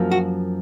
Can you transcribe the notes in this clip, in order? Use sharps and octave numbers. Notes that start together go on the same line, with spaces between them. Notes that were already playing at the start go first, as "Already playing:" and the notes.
Already playing: F#2 F3 A#3
F#4